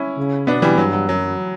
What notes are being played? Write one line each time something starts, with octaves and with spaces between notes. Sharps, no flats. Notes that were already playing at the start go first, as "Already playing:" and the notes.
Already playing: C#4 E4
C#3
B2 B3 D4
E3 G3
G2 F#3
F#3
F#2 F#3